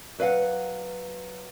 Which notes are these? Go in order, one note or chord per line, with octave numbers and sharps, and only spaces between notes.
F#3 B4 D5 F5 F#5